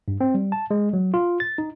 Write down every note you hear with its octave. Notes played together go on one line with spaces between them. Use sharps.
G2
C4
G3
A5
G#3
F#3
F4
A6
D#4